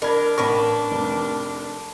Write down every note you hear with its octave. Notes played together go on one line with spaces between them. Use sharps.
D4 A#4 D5 B5 G#6
A1 A#4 B4 A5 C#6
F1